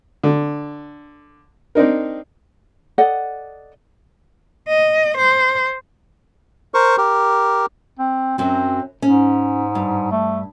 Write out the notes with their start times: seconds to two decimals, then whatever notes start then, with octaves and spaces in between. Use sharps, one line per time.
0.24 D3
1.75 C4 D4 D#4 A#4
2.98 A4 D5 D#5 F#5
4.69 D#5
5.18 C5
6.74 A#4 C5 C#6
6.98 G4 A#4
7.99 C4
8.38 F#2 F#3 C4
9.02 G#2 C#4
9.75 G2
10.11 A3